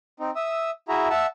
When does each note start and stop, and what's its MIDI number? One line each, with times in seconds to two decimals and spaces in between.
0.20 0.31 60
0.20 0.31 63
0.36 0.70 76
0.36 0.70 87
0.36 0.70 88
0.88 1.08 64
0.88 1.08 66
0.88 1.08 68
0.88 1.08 76
0.88 1.08 82
1.10 1.26 76
1.10 1.26 78
1.10 1.26 81
1.10 1.26 88